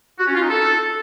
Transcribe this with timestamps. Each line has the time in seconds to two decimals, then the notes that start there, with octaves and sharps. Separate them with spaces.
0.19 F#4
0.27 C#4
0.34 F4
0.42 D#4
0.50 A4